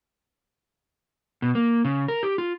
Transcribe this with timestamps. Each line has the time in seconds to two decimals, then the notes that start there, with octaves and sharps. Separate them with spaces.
1.42 B2
1.55 A#3
1.85 C#3
2.08 A#4
2.23 G4
2.38 F4